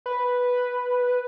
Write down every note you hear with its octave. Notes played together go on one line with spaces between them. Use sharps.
B4